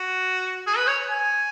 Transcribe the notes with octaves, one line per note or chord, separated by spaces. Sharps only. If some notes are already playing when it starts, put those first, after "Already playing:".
Already playing: F#4
G#4
B4
C#5
G#5